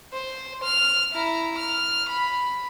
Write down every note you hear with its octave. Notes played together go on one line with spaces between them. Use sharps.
C5
F6
E4 A#5
F6
B5